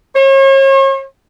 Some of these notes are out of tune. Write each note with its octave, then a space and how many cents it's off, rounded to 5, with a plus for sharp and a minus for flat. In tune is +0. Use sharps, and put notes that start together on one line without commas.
C#5 -40